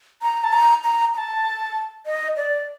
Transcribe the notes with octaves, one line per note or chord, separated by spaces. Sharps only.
A#5
A5
A#5
A#5
A#5
A5
D#5
D5